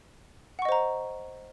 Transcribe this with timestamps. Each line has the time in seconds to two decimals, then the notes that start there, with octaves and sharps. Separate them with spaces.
0.59 F#5
0.62 C#6
0.65 D#5
0.69 C5
0.72 A#5